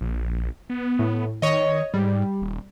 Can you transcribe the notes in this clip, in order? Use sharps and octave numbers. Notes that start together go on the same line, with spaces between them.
A#1
B3
A2
D#3 C#5 D#5
G#2 G3
D#1